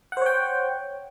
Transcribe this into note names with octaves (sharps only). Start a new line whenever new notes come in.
C5 C#5 F#5 G5